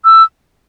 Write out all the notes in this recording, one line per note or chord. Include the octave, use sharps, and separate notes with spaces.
E6